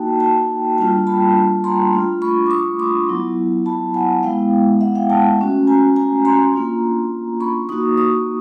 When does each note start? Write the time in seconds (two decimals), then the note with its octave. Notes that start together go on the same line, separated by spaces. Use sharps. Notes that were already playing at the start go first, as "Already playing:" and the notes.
Already playing: A#3 D#4 F#4 G5 A5
0.20 G5 A5
0.78 G3 A#3 D4 F4 G5 A5
1.07 A5 B5
1.64 A#5 C6
1.93 A3 D4 F4
2.22 B5 C#6
2.47 D6
2.51 C#6 D#6
2.79 C6 D6
3.09 F#3 B3 E4
3.66 A5 B5
3.94 F#5 G#5
4.23 G#3 B3 E4 F5 G5
4.81 E5 F#5
4.95 F5 G5
5.10 G5 A5
5.39 A3 C#4 F#4
5.67 G#5 A#5
5.96 G#5 A#5
6.25 A#5 C6
6.53 A#3 D4 F4
7.40 B5 C#6
7.69 A#3 D#4 F#4 C#6 D#6
7.98 C#6 D#6